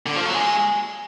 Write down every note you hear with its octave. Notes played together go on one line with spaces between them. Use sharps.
D3
F3
F#3
G#3